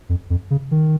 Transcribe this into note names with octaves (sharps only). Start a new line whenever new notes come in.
F2
F2
C#3
D#3